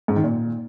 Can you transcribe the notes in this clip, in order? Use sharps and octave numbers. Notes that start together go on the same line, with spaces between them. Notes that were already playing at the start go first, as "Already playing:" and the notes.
G#2
D#3
A#2